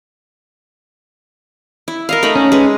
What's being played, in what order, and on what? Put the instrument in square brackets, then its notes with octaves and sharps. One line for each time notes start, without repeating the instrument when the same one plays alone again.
[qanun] E4
A#4 D#5 F5
A3 D#4 B5
[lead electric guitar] C#4
[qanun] G#3 B4